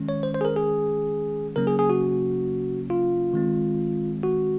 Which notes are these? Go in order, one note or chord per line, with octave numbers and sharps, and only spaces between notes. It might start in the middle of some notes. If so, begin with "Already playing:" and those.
Already playing: D#3 G#3 C#4
C#5
C5
C5
G#4
A#4
G#4
C#3 F#3 A#3 C#4 A#4
G#4
G#4
F#4
F4
D#3 G#3 C4
F#4